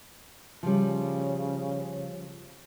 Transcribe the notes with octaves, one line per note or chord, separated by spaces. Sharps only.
C#3 F3 G3